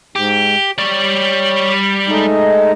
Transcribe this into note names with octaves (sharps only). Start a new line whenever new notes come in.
G#2 G4
G3 C#5 D5
G#3 A3 D#4